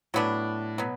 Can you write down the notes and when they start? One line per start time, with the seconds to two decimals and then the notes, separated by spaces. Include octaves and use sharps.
0.14 A2 F#3 B3 D4
0.78 B2 F#3 B3